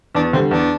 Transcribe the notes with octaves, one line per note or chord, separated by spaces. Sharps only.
E2 D4
D3 G3 C4
E2 D4